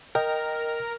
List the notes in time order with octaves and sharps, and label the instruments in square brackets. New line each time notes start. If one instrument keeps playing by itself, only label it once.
[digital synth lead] A#4 [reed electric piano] D#5 G5